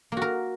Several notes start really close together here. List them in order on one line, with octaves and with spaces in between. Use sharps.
A#3 F#4 A#4